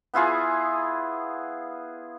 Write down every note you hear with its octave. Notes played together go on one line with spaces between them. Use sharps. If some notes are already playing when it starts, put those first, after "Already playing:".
B3 E4 F4 G#4